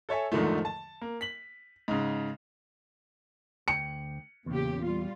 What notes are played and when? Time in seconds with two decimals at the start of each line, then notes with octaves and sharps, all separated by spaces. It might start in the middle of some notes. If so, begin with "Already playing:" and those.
0.09 A4 C#5 E5 G#5
0.32 E2 G#2 D3 D#3 F3 A3
0.65 A5
1.01 A#3
1.21 B6 F#7
1.88 G#2 C#3
3.68 D2 G5 C#7
4.46 E2 A#2 C#3 G4
4.83 G3 F4